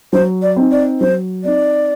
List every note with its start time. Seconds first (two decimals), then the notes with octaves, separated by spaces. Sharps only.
0.13 F#3 C5
0.42 D5
0.56 C4 D#4
0.72 D5
1.00 F#3 C5
1.44 C4 D#4 D5